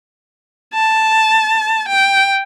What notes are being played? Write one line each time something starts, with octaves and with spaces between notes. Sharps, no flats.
A5
G5